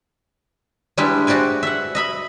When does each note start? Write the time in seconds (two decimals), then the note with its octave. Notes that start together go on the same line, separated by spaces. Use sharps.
0.97 G3 G#3 D4 E4 G4
1.27 F#4 G4 C5 D5 G#5
1.63 E5 F#5
1.95 D#5 E5 B5